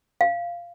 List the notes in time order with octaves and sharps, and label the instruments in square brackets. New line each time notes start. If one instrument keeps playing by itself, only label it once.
[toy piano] F5